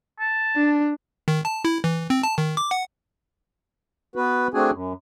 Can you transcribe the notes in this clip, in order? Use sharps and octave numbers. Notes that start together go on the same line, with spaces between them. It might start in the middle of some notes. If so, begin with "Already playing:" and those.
A5
D4
D#3
A5
E4
E3
C4
A5
D#3
D6
F#5
B3 F#4 B4
A3 C4 D4 F#4 G#4 G#5
F#2